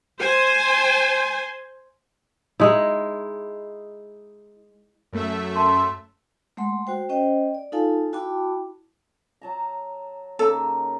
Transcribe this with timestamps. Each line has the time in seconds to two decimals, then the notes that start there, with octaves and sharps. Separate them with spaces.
0.18 C5 G#5
2.60 G#3 D#4 E4
5.12 F#2 A3 E5
5.56 A5 C6
6.57 G#3 A3 F#5 C6
6.87 F#4 C5 G5
7.09 C#4 C5 D#5 G5
7.55 D5
7.72 D#4 F4 A4 F5 G#5 A5
8.13 E4 F#4 G5 A5 B5 D6
9.41 F#3 A5 A#5
10.39 C#3 A#3 D#4 A4